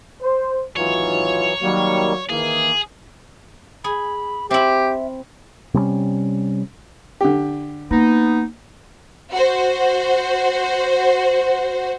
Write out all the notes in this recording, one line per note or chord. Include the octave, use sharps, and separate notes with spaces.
C5
G#1 E3 F#3 D#4 F4 C#5
D#3 F#3 G3 A#3
D#3 E3 A#3 G#4
G#4 B5
C4 E4 G4 E5
C3 G3 G#3 C#4
D3 G4
A#3 B3 D#4
F#4 C5